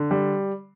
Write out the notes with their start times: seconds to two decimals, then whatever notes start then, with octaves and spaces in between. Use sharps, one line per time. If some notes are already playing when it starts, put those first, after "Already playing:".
Already playing: D3
0.11 G3